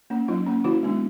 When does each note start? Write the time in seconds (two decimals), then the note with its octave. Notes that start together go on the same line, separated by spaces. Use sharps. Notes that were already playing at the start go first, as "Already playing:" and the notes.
0.10 A#3 C#4
0.28 F#3 D#4 F4
0.47 A#3 C#4
0.64 D#3 E4 F#4
0.83 G#3 B3 D4